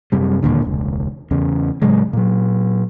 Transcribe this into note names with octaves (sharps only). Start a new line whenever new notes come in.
F#2 C3 G3
E1 D#2 A#2 D3
E1 C#2
E2 C#3
A2 C#3 F#3 G#3
A#2 F#3